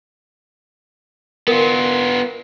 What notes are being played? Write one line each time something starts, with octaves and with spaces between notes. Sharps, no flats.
B3 F4 A#4